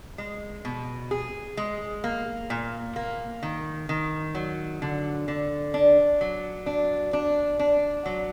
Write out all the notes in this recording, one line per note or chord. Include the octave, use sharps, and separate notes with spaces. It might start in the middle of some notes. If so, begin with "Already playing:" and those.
G#3
B2
G#4
G#3
A#3
A#2
A#3
D#3
D#3
F#3
D3
D3
D4
F#3
D4
D4
D4
F#3